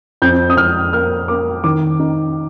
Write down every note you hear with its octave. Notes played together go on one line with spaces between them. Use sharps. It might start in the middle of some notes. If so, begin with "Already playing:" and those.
F2 G6
D#6
F2 F6
A#3 F6
A#3 D6
D#3 D6
D#4